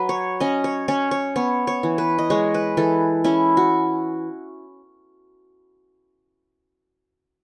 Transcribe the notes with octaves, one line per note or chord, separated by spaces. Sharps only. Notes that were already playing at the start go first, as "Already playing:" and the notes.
Already playing: F#3 B4
C#5
C#4 D#5
C#5
C#4 C#5
C#5
B3 C#5
C#5
E3
B4
D#5
G#3 C#5
B4
E3 A4
C#4 E4
F#4